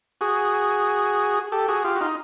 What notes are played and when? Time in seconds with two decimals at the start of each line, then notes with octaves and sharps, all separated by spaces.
0.21 F#4 G#4
1.52 G4 A4
1.68 F#4 G#4
1.84 F4 G4
1.96 F#4
2.01 D#4 F4